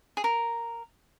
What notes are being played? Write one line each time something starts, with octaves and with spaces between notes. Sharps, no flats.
G#4
A#4